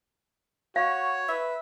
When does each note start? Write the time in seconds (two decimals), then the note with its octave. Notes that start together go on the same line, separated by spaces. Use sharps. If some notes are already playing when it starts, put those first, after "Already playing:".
0.76 F#4 C#5 F5
1.29 B4 E5